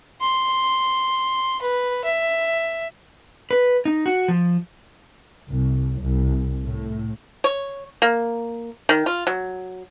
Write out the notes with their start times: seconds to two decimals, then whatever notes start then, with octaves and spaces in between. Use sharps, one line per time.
0.21 C6
1.62 B4
2.04 E5
3.51 B4
3.85 D#4
4.06 F#4
4.28 F3
5.50 C2
6.01 C2
6.64 A2
7.44 C#5
8.02 A#3
8.89 D#3
9.06 F4
9.27 F#3